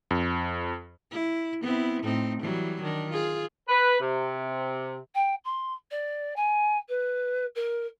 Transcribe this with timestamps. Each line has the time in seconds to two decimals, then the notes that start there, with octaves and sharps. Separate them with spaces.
0.11 F2
1.11 E4
1.62 B3 C4 E4
2.03 A2 C4 D#4
2.41 E3 F#3 G3
2.82 D#3 D4
3.11 F4 G#4
3.69 B4
4.01 C3
5.15 G5
5.44 C6
5.91 D5
6.36 G#5
6.88 B4
7.55 A#4